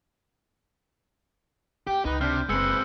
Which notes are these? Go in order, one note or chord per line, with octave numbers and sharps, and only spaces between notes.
D#2 G4 G5
C#2 D3 D#4 B4
C3 D4 F6 G6
F#1 G#3 C4 B4 E6 C#7